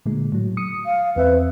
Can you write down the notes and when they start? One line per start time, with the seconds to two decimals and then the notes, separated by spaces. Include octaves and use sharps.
0.05 A#2 D3 G#3
0.32 A2 F#3
0.57 D#6 C#7
0.86 F5
1.16 E2 C4 B4 E5